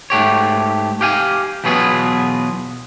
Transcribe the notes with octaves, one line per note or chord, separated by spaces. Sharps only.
G#2 A3 G4 C#5
G4 F5 G#5
E2 B2 F#3 B3 F4 G#4